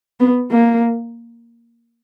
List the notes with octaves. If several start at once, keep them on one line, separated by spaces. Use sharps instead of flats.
B3
A#3